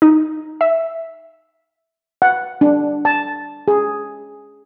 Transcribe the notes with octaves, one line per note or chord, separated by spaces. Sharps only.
D#4
E5
F#5
D4
A5
G#4